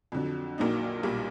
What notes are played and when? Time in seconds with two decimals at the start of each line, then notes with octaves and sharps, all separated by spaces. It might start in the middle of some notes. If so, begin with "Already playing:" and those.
0.12 F2 D3 F#3
0.58 A#1 A#2 F#3 A#3 D#4
1.03 B1 A#2 G3